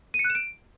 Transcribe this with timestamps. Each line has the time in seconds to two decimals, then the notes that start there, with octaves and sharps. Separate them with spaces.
0.14 D#7
0.19 C#7
0.24 F#6
0.30 E7
0.35 D7